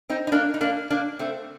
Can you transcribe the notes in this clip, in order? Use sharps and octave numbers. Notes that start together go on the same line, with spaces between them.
C4 D#4
D#4
A#3 D4
D#4
A#3 D4
A#3 D4
A3 C4